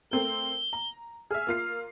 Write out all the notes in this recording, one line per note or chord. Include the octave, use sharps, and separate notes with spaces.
A3 C4 A#4 G7
A#5
G#4 E5 F6
A#3 F4 C7